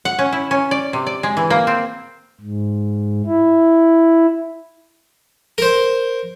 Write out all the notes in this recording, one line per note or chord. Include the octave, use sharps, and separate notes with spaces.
F#5
C#4
E4
C#4
D5
C3
D5
G#3
E3
A#3
C4
G#2
E4
A#4 C5